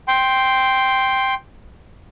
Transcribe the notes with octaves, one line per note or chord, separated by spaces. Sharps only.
G5 C6